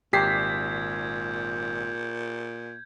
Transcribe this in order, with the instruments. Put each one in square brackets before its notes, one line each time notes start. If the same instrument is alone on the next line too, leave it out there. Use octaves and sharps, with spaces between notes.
[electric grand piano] G#1 B6 C7 [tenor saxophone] A#2 [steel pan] G4 [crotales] G6 G#6